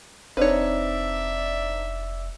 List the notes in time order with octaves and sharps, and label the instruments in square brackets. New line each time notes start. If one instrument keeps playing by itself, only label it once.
[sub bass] F1 [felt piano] C4 D4 D#4 [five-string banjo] B4 C#5 [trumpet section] D5 E5